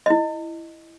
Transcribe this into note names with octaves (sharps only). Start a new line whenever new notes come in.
E4 D#5